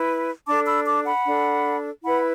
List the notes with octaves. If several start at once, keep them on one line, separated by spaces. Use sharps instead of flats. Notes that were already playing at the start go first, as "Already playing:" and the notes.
Already playing: E4 B4
D4 A4 A5 D6
B5 E6
A5 D6
F#5 B5
D4 A4
E4 B4 F#5 B5